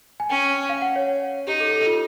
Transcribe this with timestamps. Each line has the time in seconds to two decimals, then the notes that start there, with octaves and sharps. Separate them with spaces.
0.20 G#5
0.30 C#4 G5
0.69 F5
0.82 F#5
0.96 C#5
1.47 D#4 G4
1.60 A4
1.73 A4
1.86 F4